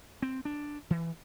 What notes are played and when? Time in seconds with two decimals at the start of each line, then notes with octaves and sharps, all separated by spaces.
0.22 C4
0.45 D4
0.90 E3